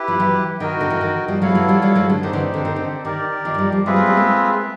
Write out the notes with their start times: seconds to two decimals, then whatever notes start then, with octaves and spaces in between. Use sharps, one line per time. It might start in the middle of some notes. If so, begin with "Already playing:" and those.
Already playing: E4 G4 B4
0.08 F3
0.20 E3 F#3
0.60 D#3 F#4 A#4 D#5 G5
0.81 D3
0.90 E3
1.01 D#3
1.28 F3 G3
1.42 F#3 G#3 B3 E4 A4 C#5 F5
1.55 E3 F#3
1.68 F3 G3
1.82 F3 G3
1.95 F#3 G#3
2.09 D3
2.23 D#3 C4 D#4 G4 C5
2.33 D3 E3
2.54 D3
2.65 D#3
2.76 D3
3.05 D#3 G4 A#4 D5
3.45 D#3 F3
3.54 F#3
3.58 F3 G3
3.72 F3 G3
3.86 F#3 G#3 C4 F4 G#4 B4 E5
3.96 G3 A3
4.06 G3 A3
4.16 G#3 A#3